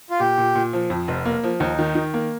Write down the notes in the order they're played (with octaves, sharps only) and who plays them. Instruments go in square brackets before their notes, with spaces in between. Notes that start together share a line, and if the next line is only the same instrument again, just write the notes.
[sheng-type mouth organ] F4
[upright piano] A#2 [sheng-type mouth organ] G4
[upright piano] A#2
A#2
F3
F2
F1
A#3
F3
[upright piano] D#2 [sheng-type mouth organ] D#4
[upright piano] D#3
D#3
A#3